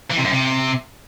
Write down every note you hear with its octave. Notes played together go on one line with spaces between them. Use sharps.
E3
C3
F#2
C3